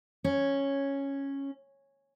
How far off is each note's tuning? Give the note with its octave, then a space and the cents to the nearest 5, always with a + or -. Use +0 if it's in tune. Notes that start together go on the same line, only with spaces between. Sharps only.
C#4 -5